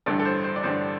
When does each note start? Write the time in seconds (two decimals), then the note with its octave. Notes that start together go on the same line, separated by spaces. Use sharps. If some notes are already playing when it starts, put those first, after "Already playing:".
0.06 A1 G2 D3 A4
0.19 A4
0.25 C5
0.44 C5
0.56 D5
0.63 A1 G2 D3 C5